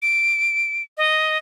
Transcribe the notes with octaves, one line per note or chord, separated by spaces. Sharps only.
D7
D#5